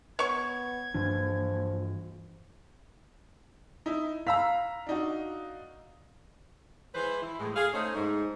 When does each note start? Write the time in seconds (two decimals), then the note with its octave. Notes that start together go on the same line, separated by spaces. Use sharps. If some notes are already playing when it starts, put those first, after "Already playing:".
0.19 B3 C#5 C#6 G#6
0.94 G2 E3 F3 D4
3.86 D#4 E4
4.27 F5 A#5 E6 B6
4.87 D4 D#4 F#4
6.94 E3 G#3 B4 C5
7.22 E4
7.39 A2 G#3
7.55 G#4 F5
7.73 A3 C#4 D#4 C5 D#5
7.94 G#2